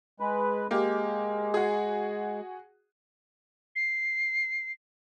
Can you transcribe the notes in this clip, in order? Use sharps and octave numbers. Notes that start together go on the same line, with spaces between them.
G#3 B4
G#3 A#3 G4
F#4 G#4
C7